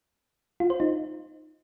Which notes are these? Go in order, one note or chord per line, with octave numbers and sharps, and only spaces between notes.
F4
C5
D#4